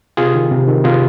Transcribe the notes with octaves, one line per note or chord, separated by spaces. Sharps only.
C3 F4 G#4
D#3
C3
D#3
C3 F4 G#4